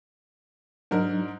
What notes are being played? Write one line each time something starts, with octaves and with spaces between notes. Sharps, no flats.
G#2 F#3 D4 D#4 A#4